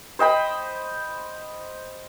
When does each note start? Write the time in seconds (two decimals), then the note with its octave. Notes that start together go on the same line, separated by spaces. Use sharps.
0.19 C5 D#5 G5 B5